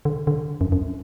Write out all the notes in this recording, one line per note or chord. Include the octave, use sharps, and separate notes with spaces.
D3
D3
F#2
F#2